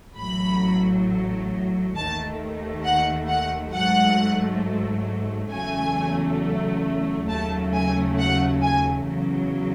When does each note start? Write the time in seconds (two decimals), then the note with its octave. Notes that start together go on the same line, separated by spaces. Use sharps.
0.17 A1 A2 F#3 A3 B5
1.95 D#2 D#3 A3 A5
2.84 F#5
3.28 F#5
3.73 G#2 F#3 A3 F#5
5.51 E2 C#3 F#3 A3 G#5
7.29 D#2 C#3 F#3 A3 A5
7.74 G#5
8.18 F#5
8.62 G#5
9.06 E2 C#3 F#3